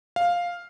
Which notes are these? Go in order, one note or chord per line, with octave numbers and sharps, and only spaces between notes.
F5